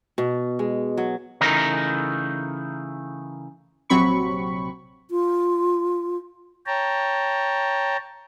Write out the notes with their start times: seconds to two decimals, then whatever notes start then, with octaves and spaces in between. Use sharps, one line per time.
0.18 B2
0.59 G#3
0.97 F#3
1.41 C#3 E3 A3 D#4 A#4 A#5
3.90 A#1 C3 F#3 C4 B5 C#6
5.11 F4
6.66 C#5 G5 A5 A#5